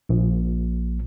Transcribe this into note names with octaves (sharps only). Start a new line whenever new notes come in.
A#1